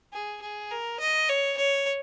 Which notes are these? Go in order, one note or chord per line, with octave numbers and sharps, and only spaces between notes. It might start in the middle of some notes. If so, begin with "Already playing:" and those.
G#4
G#4
A#4
D#5
C#5
C#5